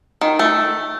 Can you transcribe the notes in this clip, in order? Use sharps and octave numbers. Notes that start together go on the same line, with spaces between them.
D#3
A3